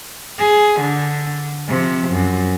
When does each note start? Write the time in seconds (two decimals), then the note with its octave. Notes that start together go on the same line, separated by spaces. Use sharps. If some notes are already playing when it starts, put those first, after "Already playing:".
0.38 G#4
0.81 D3
1.68 C3 F3
2.11 F#2